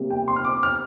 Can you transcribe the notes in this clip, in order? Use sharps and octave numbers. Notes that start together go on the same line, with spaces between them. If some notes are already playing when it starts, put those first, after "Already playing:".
Already playing: C3 G3 A#3
G5
C6
F6
D6
F6